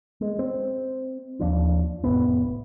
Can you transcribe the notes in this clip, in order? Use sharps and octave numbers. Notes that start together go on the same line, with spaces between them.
G#3
C4
D#2 F3 D4
F1 D#2 A2 B3